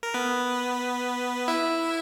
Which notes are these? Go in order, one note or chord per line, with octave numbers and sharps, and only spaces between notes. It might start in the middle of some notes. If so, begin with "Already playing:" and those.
A#4
B3 B4
E4 E5